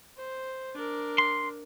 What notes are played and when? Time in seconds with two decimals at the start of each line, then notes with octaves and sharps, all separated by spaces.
0.16 C5
0.75 D4 A#4
1.18 C6